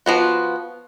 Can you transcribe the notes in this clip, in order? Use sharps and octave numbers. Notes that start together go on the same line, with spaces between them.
F3 B3 F#4